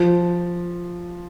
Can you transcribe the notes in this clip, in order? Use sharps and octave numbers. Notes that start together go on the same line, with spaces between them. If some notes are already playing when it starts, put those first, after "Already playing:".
Already playing: F3